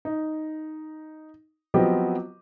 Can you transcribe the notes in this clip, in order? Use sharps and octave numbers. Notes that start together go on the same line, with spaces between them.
D#4
F3 F#3 B3 C4 G4 D#5